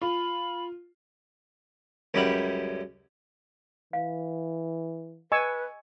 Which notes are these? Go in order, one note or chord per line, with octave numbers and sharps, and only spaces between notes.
F4 B5
C#2 F#2 G3 E4 G4 F#5
E3 F5
B4 D#5 G#5 C#6 E6